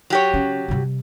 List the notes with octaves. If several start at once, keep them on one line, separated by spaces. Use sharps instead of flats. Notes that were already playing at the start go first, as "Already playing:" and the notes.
F#3 G4 C#5
C#3 C#4
C3 G3